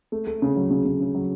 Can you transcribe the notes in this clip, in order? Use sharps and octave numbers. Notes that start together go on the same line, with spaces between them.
A3
A3
C#3
F#3
C#3
C#3
C#3
F#3